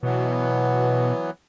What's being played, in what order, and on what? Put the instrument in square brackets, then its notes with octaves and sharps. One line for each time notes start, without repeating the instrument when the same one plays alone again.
[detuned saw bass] B2 [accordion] E3 F#3 B3